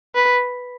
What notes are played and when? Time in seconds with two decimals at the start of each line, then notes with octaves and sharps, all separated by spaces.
0.15 B4